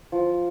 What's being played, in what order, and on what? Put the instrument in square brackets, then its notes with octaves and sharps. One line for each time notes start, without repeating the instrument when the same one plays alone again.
[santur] F3